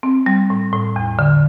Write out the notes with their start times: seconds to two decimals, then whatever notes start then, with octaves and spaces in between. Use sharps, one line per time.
0.03 C4
0.26 G3
0.50 A2
0.73 A2
0.96 E2
1.19 D3